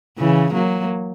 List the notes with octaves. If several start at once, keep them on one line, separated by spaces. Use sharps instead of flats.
C#3 E3
F#3 A#3